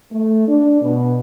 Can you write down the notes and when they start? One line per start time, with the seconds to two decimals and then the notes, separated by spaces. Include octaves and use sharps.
0.11 A3
0.47 D4
0.82 B2